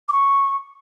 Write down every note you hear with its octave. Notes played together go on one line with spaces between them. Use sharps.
D6
C#6